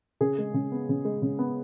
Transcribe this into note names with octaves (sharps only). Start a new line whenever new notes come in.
C#3 G#4
G#3
C#3
B3
C#3
G#3
C#3
B3